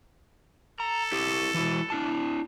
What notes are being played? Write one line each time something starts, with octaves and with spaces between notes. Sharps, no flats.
A4 A#5
E4 G4
E3 E4 F#4
D4 E4 A5